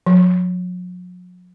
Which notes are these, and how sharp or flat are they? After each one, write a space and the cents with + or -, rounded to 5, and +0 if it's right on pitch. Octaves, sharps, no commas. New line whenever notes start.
F#3 -45